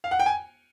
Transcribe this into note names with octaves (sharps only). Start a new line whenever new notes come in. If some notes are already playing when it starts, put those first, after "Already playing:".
F5
F#5
G5
G#5